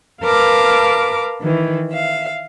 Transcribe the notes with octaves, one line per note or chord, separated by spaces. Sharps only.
A#4 B4 F5 A5 D6
D#3 E3
E5 F5